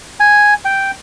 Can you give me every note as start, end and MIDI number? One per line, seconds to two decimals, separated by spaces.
0.20 0.54 80
0.65 0.91 79